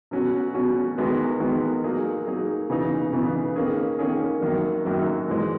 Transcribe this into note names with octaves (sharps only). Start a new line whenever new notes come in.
B2 F#3 C#4 F#4
B2 F#3 C#4 F#4
E2 D#3 G#3 B3 F#4
E2 D#3 G#3 B3 F#4
F#3 A#3 D#4 G#4
F#3 A#3 D#4 G#4
C#3 E3 B3 D#4
C#3 E3 B3 D#4
D#3 A#3 C#4 G#4
D#3 A#3 C#4 G#4
F#2 D#3 F#3 A#3
F#2 D#3 F#3 A#3
G#2 E3 G#3